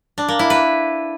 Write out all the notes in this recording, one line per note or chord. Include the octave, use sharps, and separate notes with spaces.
D4
A#3
E4
B4